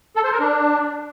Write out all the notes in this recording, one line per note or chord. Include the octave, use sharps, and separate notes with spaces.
A4
C5
A#4
D4